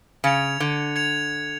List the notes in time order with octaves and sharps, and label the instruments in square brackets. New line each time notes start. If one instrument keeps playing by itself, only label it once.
[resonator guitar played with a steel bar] C#3 [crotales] G#6 C#7 F7
[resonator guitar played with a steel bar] D3
[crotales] G#6 C#7 F7